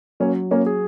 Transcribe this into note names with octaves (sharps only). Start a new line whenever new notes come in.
F#3 A#3 C#4
A#3 C#4
G#4